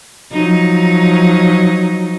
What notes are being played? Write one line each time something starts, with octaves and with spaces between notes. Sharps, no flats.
F3 F#3 D#4